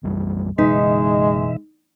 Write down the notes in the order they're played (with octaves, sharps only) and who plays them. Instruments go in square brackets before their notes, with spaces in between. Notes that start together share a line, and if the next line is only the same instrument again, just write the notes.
[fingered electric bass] B1 F#2 G3
[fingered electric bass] F#1 [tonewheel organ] B2 E3 E5 [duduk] G#3 [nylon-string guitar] D#4